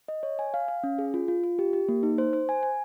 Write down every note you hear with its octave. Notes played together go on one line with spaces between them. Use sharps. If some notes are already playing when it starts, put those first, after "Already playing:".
D#5
C#5
G#5
F5
F5
C#4
G#4
F4
F4
F4
G4
G4
A#3
D#4
C5
C5
G#5
G#5